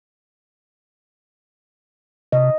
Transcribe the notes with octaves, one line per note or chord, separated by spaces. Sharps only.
C3 D#5